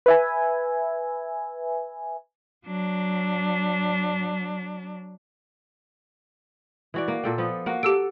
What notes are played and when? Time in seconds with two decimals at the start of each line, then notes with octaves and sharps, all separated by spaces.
0.06 B4 E5 G#5
2.66 F#3 D4
6.94 E3 F#4 D5
7.08 A#3
7.23 A#2 A4 G5
7.38 F3 B3
7.66 A#3 F#4 F#5
7.83 G4 A4 E6 D7